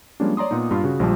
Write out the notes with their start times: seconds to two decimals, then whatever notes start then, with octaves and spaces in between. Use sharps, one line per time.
0.20 F3 G3 G#3 A#3 C#4 D4
0.37 C#5 D5 A#5 C6 D#6
0.51 A#2 B3 D#4
0.71 G2 F4
0.84 C#3 F#4
1.00 A#1 F3 G3 G#3 A5